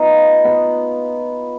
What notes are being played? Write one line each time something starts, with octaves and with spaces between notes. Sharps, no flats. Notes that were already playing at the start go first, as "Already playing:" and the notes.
Already playing: B3 D#4 F4
B3